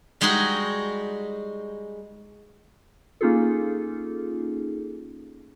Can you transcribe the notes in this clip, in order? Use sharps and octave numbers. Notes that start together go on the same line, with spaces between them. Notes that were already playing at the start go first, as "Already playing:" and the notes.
G3 G#3 D#4 F#4 G#4
A#3 C#4 D#4 F4 G#4 A4